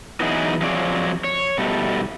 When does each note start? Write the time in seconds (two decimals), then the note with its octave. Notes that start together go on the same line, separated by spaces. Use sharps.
0.20 E3 F#3 B3 D#4 E4 G#4
0.61 F3 F#3 C4 G#4 C#5 D5
1.24 C#5
1.58 B2 G3 A3